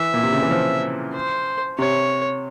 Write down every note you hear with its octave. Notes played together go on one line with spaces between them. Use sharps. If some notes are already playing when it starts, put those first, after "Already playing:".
Already playing: E3 E5
A#2
C3
C#3
E3
F3
C5
C3 C#5